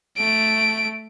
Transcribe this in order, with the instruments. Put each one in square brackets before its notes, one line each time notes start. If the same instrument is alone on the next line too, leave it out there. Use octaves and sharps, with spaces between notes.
[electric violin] A3 D7